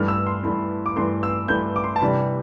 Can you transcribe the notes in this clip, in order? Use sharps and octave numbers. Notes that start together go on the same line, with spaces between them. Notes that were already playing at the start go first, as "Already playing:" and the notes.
Already playing: G2 E3 A3 E4 F6
E6
C6
G2 E3 A3 E4
D6
G2 E3 A3 E4 C6
E6
G2 E3 A3 E4 G6
D6
C6
A5
C3 E3 G3 D4 B5